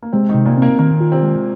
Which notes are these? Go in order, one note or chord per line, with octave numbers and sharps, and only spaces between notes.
A#3
C3 G#3 C4
D#3 D#4
C3
A#2 A#3
A#3 C4 A#4
D#3 A#3 A#4
F4
C3 C4
G#3